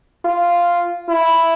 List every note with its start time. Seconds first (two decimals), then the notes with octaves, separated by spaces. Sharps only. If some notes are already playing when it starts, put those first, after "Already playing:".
0.25 F4
1.09 E4